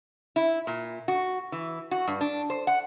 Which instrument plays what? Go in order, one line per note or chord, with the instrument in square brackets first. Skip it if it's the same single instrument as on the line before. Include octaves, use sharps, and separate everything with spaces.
[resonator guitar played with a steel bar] E4
A#2
F#4
E3
F#4
G2
D4
C5
F#5